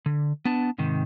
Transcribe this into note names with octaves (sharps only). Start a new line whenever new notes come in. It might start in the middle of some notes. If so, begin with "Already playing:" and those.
D3
B3 D4 A5
G#2 C3 D#3